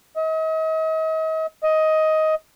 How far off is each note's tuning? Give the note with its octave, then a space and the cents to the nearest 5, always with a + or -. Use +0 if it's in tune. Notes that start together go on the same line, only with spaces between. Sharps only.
D#5 +40
D#5 +15